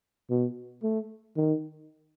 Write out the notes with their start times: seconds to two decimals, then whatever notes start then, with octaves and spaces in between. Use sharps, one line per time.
0.30 B2
0.83 A3
1.37 D#3